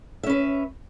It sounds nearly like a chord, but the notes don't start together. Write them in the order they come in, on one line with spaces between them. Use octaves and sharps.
E5 C#4 B4